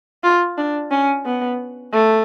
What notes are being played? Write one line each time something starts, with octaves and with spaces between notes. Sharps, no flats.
F4
D4
C#4
B3
A3